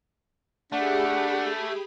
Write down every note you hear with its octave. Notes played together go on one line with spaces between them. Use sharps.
A3 D4 G4 G#4 F#5 B5